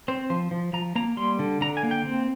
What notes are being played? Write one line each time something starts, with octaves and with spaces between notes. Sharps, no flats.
C4 C5
F3 C5
F3
F3 A#5
A#3 A#5
G3 C6
D3
D3 A#5
G#5
A#3
G5
C4